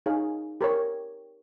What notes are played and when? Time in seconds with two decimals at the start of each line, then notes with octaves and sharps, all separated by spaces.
0.06 D#4 G#4 C#5 F5 G#5
0.61 G4 A#4 C#5